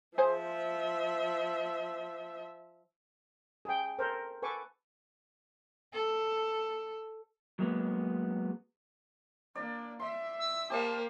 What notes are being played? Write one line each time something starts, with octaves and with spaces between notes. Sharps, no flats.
F3 G#4 C5 E5
G#4 G5
A4 A#4 C5
A4 B4 G#5 C#6 D6
A4
F#3 G#3 A#3 B3
A#3 D4 D5
E5 C6
E6
A#3 G4 C5 D5 F5 A5